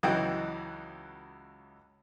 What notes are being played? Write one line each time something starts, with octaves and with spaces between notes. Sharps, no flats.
C#2 E3 F#3 D#4 F#4 G5